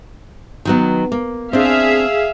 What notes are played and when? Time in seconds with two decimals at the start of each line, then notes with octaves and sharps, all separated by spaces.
0.65 D#3 F#3 B3
1.12 A#3
1.53 C4 D4 G#4 E5 F5